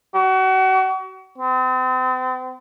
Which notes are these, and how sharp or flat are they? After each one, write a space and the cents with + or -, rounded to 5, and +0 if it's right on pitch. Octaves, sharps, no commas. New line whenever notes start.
F#4 +35
C4 -40